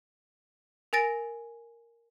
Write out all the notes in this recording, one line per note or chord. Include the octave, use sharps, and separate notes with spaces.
A#4 G#5 A6 A#6 D7